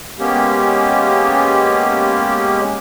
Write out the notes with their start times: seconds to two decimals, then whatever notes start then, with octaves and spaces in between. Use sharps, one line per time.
0.19 G#3 A#3 B3 C#4 G4